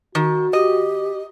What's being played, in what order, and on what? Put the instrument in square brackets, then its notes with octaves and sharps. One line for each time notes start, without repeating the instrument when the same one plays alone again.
[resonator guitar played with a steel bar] D#3 [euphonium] F#4
[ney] G4 [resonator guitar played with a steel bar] D#5